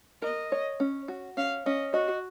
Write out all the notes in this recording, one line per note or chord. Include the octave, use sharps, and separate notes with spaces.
A#4 D#5
C#5
C#4
F#4
C#4 F5
C#4 D#5
F#4 D#5